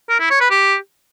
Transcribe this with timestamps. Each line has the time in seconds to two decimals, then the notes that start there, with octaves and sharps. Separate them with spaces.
0.10 A#4
0.20 E4
0.30 C#5
0.41 B4
0.51 G4